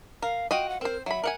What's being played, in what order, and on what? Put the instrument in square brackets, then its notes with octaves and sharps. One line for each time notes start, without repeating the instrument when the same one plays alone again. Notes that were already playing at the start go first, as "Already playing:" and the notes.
[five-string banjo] A#4 [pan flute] F5
[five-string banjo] F4 F#4 D#5 [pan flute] G5
[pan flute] F#5
[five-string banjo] C4 C5 [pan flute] A#4
[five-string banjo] F#3 B5 [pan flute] E5
[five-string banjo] A#4 F#5 G#5